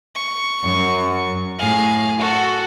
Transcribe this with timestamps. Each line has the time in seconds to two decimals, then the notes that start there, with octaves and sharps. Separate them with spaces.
0.15 C#6
0.65 F#2
1.59 A2 G#4 F5
2.20 F#4 A4